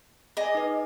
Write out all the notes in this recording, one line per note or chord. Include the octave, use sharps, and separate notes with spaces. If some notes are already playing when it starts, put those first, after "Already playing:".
G#4 D5 D#5 G#5
D#4 B4